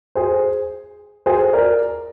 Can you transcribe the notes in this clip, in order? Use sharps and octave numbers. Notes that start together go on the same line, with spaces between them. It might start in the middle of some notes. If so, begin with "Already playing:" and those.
G#4 C5
G#4 C5
A#4 D5